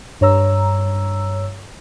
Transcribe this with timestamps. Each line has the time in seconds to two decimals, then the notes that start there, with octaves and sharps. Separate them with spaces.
0.21 G2 C#5 A#5 E6